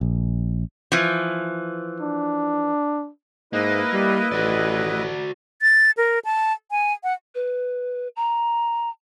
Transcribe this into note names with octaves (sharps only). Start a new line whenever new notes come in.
A#1
E3 F3
D4
G#2 A#3 E4 B4 D#5
G3
A1 F#4 D5
A6
A#4
A5
G#5
F#5
B4
A#5